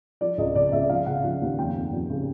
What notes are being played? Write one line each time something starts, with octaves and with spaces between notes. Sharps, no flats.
F3 D5
C#2 D#5
C#3 D5
C#2 E5
F3 F5
C#3 F#5
F3
D#2
F2 G5
F2
F2
C#3